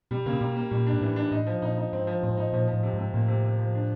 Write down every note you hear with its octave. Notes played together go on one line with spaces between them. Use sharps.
B2 G3
C#3 A#3
C3
B2 G3
A#3
A#2 G3
D4
G#2
A2 E3
D4
A2 D#4
F3
A#2 D#4
D#4
G#2 C4
F3
A2 C4
G#2
A2 D#4
A#2 F3
F3
A2
C3
G#2
C3
A2 A#3
C3
C3
F3
D4